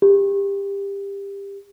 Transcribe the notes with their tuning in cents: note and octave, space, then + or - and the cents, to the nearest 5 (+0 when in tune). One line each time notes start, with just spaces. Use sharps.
G4 +20